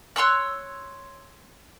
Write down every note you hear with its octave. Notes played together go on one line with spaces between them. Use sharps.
C#5 C6 E6 F#6